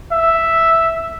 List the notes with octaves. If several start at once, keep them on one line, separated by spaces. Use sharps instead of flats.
E5